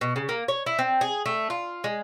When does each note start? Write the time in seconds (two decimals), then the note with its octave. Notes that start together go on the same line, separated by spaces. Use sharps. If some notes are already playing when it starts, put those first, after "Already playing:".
0.01 B2
0.16 C#3
0.29 A#3
0.48 C#5
0.66 E4
0.79 C4
1.01 G#4
1.26 A3
1.50 F4
1.84 G#3